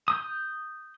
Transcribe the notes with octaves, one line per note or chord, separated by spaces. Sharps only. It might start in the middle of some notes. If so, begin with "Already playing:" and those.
D#6 G6